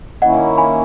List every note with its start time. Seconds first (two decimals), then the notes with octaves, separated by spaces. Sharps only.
0.22 D#3 A#3 C#4 E4 D#5 F#5
0.58 G#5 B5